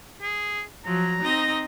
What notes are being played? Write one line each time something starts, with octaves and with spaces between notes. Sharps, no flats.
G#4
F3 F#3 A#5
C4 D#4 D#5